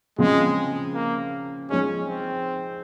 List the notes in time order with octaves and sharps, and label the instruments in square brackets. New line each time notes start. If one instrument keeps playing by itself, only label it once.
[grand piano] C#3 F3 C4 [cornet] G#3
[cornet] A#3
[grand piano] F3 G#3 D#4 G#4 [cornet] C#4
[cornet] C4